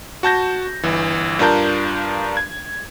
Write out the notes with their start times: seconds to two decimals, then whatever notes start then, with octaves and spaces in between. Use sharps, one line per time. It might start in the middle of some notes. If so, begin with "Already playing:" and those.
0.23 F#4 A5 G6 A#6
0.83 G1 E3
1.39 G2 D4 F4 A#4 A5 G6
2.37 G#6